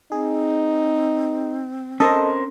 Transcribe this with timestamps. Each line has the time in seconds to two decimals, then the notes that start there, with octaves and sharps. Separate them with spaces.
0.12 C4 D#4 G#4
2.00 C#4 A4 A#4 C5 D#5